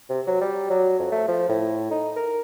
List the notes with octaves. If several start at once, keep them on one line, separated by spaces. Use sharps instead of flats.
C3
F#3
G3
F#3
F2
A3
F3
A2
D#4
A#4